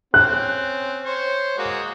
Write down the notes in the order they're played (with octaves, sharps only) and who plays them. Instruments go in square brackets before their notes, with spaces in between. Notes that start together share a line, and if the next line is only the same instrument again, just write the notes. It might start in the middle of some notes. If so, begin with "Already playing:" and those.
[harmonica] C4 C#4 [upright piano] F#6
[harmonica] C5 C#5
G#3 A#3 F#4